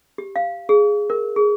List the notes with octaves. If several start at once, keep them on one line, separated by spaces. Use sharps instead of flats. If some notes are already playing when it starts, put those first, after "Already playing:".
G4
F5
G#4
A#4
G#4